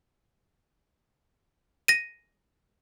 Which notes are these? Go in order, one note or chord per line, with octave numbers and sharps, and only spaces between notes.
A#6 D#7